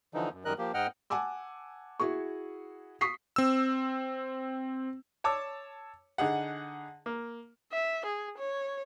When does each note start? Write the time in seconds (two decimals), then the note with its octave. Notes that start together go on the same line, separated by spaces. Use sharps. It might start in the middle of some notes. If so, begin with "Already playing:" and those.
0.14 D3 E3 F3 D#4
0.33 F#2
0.45 F#2 D#3 G3 A#4 D#5 F#6
0.58 F3 A#3 G4
0.74 G#2 D#5 F#5 G5 F6
1.10 F#5 G#5 A5 D6 E6
2.00 E4 F#4 G#4 C#6
3.01 C#6 D#6 B6 C7
3.36 C4 E6
5.24 C#5 A5 D6 E6
6.18 D3 D#4 G#4 F#5
7.06 A#3
7.72 E5
8.05 G#4
8.38 C#5